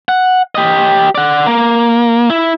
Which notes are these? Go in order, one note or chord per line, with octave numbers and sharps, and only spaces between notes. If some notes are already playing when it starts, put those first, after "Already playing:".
F#5
G4 D#5
D5 F#5
A#3
E4